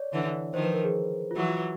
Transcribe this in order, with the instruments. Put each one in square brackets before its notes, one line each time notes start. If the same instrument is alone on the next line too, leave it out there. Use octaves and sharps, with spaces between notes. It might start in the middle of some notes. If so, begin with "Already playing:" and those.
Already playing: [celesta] C#5 D5
[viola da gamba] D3 E3
[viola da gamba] D#3 F3 [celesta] C5
[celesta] B4
A#4
G#4
F4
[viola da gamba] E3 F#3 [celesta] F#4
[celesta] F4